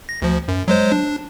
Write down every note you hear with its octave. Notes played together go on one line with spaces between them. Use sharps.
A#6
D2 F3
F#2
F#3 G#3 C5
D4